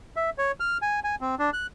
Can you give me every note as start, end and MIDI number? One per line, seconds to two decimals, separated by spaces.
0.16 0.30 76
0.38 0.52 73
0.60 0.78 89
0.82 1.00 80
1.04 1.15 80
1.21 1.35 60
1.39 1.50 62
1.53 1.67 90